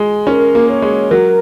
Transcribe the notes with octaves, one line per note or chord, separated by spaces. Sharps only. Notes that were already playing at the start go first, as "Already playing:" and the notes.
Already playing: G#3
C#4 A#4
A#3
C#5
G#3
F#3 A#4